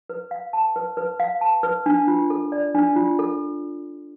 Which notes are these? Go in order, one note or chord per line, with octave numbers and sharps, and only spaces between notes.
B4
F5
A5
B4
B4
F5
A5
B4
D4
F4
A4
D5
D4
F4
A4